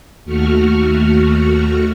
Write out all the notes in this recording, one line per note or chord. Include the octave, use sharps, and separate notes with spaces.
D#2 A3 F#4 C#6 F6